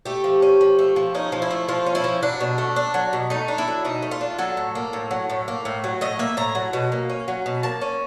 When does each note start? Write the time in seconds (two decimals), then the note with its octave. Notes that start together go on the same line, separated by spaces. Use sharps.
0.05 A3 G4
0.24 F3
0.42 C#4
0.61 F3
0.79 A3
0.96 F3
1.15 C#4 D#4
1.32 F3
1.42 E4
1.51 A3
1.68 F3 F4
1.86 C#4
1.95 E4
2.04 F3
2.23 F#3 D4
2.40 B2
2.58 A3
2.76 D4
2.94 F#3
3.13 B2
3.30 A3 D#4
3.48 D4
3.58 E4
3.67 F#3
3.85 B2 D#4
4.02 A3
4.11 F4
4.21 D4
4.38 F#3 A4
4.57 A2
4.75 A#3
4.93 A2
5.11 F#3
5.30 A2
5.48 A#3
5.65 A2
5.84 F#3
6.01 A2 D#5
6.19 A#3 E5
6.37 A2 A#5
6.55 F#3
6.73 B2
6.92 A#3
7.10 C#4
7.28 F#3
7.46 B2
7.63 A#3 A5
7.81 C#4